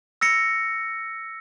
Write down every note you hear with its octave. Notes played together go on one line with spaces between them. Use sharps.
E6 A#6 C#7